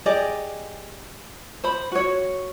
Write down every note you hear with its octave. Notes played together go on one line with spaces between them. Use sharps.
G4 G#4 D5 D#5
C5 B5
F#4 C#5